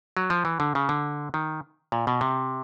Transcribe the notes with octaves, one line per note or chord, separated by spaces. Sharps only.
F#3
F3
E3
D3
C#3
D3
D#3
A#2
B2
C3